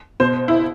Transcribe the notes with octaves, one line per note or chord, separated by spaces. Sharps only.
B2 C5
E4